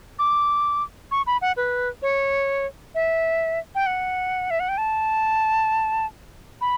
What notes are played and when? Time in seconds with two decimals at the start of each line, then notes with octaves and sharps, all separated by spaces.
0.19 D6
1.11 C#6
1.27 B5
1.41 F#5
1.57 B4
2.02 C#5
2.95 E5
3.75 G5
3.86 F#5
4.50 E5
4.60 F#5
4.69 G5
4.78 A5
6.61 B5